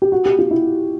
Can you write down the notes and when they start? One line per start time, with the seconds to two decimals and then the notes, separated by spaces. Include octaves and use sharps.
0.02 G4
0.12 F#4
0.26 G4
0.39 F4
0.51 E4